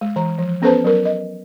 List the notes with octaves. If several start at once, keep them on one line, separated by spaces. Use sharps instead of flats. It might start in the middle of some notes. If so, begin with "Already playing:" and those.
G#3
E3 A#5
F3
B3 C#4 A4 B4 C5 A5
F#3 A#4
D#5